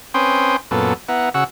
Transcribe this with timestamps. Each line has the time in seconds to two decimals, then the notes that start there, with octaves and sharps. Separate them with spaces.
0.14 C4 C#4 B4 G5 C6 D#6
0.71 F#2 A#2 B3 A4
1.09 B3 E4 F#5 A#5
1.34 C#3 F#4 F#5 E6